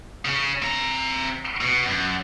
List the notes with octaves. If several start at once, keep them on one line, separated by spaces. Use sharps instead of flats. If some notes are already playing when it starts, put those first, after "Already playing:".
C#3 C#4
C4 A#5
B2
F#2